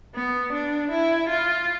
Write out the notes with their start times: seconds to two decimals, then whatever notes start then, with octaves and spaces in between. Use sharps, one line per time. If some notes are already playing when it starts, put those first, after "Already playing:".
0.15 B3
0.53 D4
0.91 E4
1.29 F4